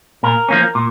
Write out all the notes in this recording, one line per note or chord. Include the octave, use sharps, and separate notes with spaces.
A#2 A#4
F3 A#3 C#4
A#2